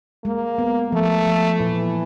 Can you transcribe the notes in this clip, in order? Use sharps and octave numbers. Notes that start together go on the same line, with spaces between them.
G#3 A#3
B3
F3 A3
F3
A#2 E3